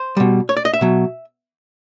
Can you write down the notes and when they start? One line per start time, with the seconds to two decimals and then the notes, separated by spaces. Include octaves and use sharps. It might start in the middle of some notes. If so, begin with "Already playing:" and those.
Already playing: C5
0.17 B2 G3
0.49 C#5
0.57 D5
0.65 D#5
0.74 E5
0.81 B2 F#3